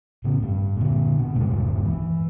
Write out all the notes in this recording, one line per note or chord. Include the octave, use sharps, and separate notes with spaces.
A2 C#3
G2
A#2 D3
B2
D#1 C#2 G2 G#3
E3